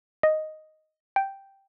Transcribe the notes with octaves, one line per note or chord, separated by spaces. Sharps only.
D#5
G5